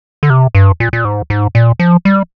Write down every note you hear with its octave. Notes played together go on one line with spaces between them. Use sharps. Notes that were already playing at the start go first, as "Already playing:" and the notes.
D3
C3
G2
A#2
A#2
G#2
G#2
A#2
F3
G3